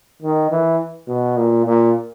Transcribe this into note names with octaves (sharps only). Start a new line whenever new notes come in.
D#3
E3
B2
A#2
A#2